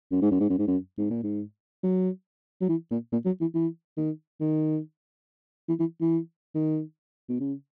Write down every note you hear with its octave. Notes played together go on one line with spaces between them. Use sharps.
F#2
G#2
F#2
G#2
F#2
G#2
F#2
G#2
A#2
G#2
F#3
F#3
E3
A#2
A#2
F#3
E3
E3
D#3
D#3
E3
E3
E3
D#3
B2
C#3